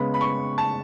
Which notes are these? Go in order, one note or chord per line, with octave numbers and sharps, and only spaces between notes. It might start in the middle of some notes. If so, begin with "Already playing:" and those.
Already playing: C#3 G#3 B3 B5
B5
C#6
A5